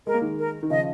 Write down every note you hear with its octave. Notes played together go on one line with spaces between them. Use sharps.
G#3 A#4
A#3
D#3 G#3
A#4
D#3
C#3 F3 D#5